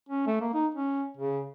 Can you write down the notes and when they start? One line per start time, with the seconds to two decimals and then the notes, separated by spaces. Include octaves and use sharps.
0.09 C#4
0.27 A3
0.41 A#3
0.54 D#4
0.75 C#4
1.17 C#3